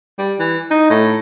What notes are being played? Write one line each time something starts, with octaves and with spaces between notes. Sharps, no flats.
G3
E3
D#4
A2